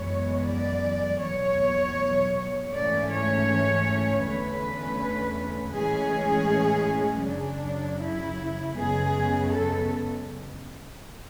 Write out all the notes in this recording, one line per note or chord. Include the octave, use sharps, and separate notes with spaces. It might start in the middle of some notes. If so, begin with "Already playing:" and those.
Already playing: F#2 E3 G#3 B3 C#5
D5
E2 B2 F#3 C#5
G#2 E3 A3 C#4 D5
C#5
E2 D3 A3 C#4 B4
A2 E3 G#3 C#4 G#4
F#2 C#3 F#3 D4
E4
F#2 C#3 G#3 B3 G#4
A4